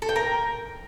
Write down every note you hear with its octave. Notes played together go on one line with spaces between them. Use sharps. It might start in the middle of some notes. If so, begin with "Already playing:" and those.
A4
G5
A#4